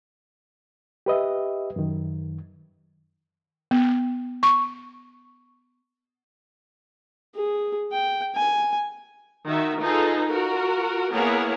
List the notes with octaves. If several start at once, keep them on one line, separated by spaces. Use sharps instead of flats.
G4 B4 D#5 E5
F#2 D#3
B3
C#6
G#4
G5
G#5
D#3 F#4 E5
D#4 F4 G#4 A4 B4
F4 F#4 A#4
A#3 B3 E4 G#4 A#4 C#5